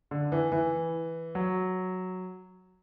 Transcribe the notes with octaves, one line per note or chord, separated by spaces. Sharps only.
D3
E3
E3
F#3